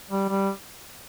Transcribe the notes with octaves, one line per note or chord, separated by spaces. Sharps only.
G3
G3